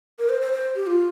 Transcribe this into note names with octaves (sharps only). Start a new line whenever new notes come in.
A#4
C5
C5
C5
G4
F4